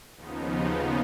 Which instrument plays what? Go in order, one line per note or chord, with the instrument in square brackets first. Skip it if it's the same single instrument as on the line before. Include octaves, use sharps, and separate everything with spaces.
[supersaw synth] D#2 C#3 F3 B3 D#4